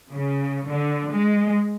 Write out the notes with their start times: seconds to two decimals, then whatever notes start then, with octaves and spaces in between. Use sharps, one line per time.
0.12 C#3
0.68 D3
1.10 G#3